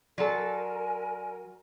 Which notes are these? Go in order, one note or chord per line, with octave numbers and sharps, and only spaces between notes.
F#3 A4 A#4 D5 G#5 C6